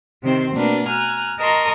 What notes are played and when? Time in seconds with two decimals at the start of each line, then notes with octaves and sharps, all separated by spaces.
0.23 C3 D#3 C4 C5
0.55 B2 A3 A#3 D4 A#4 B4
0.87 G#5 A#5 F6 F#6
1.39 A#4 D#5 A5 A#5 C6 C#6